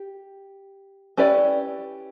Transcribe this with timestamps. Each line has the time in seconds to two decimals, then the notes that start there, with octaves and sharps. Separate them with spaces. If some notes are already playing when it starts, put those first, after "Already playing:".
Already playing: G4
1.17 C#4 E4 G4 B4 D5